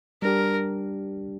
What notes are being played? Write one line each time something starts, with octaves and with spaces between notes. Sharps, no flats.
G3 D4 G4 A#4